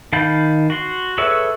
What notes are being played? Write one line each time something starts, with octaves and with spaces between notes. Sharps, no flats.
D#3 F5 A5 B5 G6
F#4 C6
G#4 A4 B4 C#5 E5